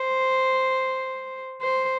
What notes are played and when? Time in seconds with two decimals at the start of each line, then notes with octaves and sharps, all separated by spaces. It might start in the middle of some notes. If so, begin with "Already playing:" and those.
Already playing: C5
1.61 C5